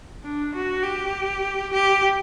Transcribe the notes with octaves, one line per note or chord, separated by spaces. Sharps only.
D4
F#4
G4
G4